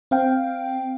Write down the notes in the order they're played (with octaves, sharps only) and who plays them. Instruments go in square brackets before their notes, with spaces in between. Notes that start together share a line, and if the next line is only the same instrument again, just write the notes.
[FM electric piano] C4 F5 G5